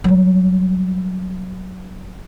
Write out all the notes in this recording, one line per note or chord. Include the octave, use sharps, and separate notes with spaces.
F#3 G3